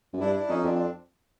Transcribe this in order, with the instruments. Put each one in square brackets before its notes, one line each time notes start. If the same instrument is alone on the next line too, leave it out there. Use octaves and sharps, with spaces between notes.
[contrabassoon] F#2
[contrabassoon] G2 [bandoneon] D4 E4
[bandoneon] D4 E4
[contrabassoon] F2 [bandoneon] C#4 D#4
[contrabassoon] F2 [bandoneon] C4 D4
[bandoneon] C4 D4